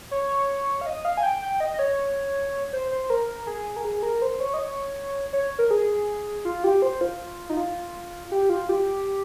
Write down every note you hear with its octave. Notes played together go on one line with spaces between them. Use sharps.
C#5
F5
D#5
F5
G#5
G5
G5
D#5
D#5
C#5
C5
C5
A#4
G#4
A#4
G#4
A#4
C5
C#5
D#5
C#5
C#5
A#4
G#4
F4
G4
C5
F4
D#4
F4
G4
F4
G4